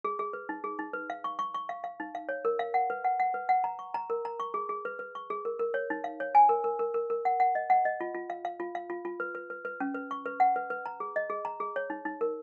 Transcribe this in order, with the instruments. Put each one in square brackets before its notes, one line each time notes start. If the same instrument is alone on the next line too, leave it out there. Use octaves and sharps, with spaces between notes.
[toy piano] G#4
G#4
B4
D#4
G#4
D#4
B4
F5
C#6
C#6
C#6
F5
F5
D#4
F5
C#5
A#4
F5
F#5
B4
F#5
F#5
B4
F#5
A#5
C#6
A#5
A#4
A#5
C#6
G#4
G#4
B4
B4
C#6
G#4
A#4
A#4
C#5
D#4
F5
C#5
G#5
A#4
A#4
A#4
A#4
A#4
F#5
F#5
D#5
F#5
D#5
F4
F4
F5
F5
F4
F5
F4
F4
B4
B4
B4
B4
C#4
B4
C#6
B4
F#5
B4
B4
A#5
G#4
D#5
G#4
A#5
G#4
C#5
D#4
D#4
A#4